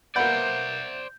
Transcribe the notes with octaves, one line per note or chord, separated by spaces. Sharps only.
A#3 B3 C5 D5 E5 F#5 B5 G6